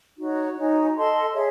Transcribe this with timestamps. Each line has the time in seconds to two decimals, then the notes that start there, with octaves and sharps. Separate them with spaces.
0.18 D#4 F#4 C#5
0.56 D#4 F#4 C#5 G#5
0.95 A4 D#5 A5 C6
1.33 G#4 C#5 E5